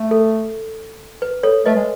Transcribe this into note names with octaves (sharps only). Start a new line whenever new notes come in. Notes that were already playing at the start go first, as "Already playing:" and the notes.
Already playing: A3
A4
B4
A4 C#5
A3 B4 D#5
G#3